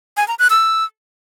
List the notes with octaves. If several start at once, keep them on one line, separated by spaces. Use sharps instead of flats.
G#5
A#5
F#6
E6